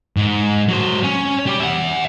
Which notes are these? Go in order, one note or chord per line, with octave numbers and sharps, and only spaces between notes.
G#2
F#3 C5
C#4
G4 D5
E5 F#5